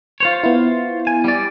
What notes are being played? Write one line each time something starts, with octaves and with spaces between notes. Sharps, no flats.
F4 C5 C#5
B3 E4
G#5
G3 D5